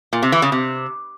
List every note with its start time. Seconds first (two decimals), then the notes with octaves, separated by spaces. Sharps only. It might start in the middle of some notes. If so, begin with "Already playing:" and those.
0.13 A#2
0.23 C3
0.32 E3
0.42 C#3
0.52 C3